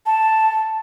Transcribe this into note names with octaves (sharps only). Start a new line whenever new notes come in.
A5